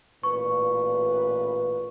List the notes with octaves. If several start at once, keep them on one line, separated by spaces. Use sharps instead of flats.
A1 A#2 B4 C#6